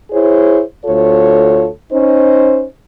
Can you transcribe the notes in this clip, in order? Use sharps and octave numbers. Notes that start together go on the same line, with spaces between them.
E4 G#4 C5 C#5
D2 F4 A4 C#5
C#4 D#4 C5